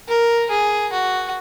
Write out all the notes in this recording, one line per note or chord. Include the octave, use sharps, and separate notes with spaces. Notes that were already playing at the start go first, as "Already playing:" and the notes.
A#4
G#4
F#4